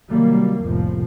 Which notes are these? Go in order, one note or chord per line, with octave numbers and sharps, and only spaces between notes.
C3 D#3 F#3 G3 A#3
F1 C2 A2 F3